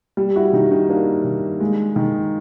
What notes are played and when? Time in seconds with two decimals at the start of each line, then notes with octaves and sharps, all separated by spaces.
0.17 G3
0.36 E4 F#4
0.53 D#3 D#4
0.71 D#4
0.89 A#3 D4
1.24 D#3
1.61 G#3
1.96 D#3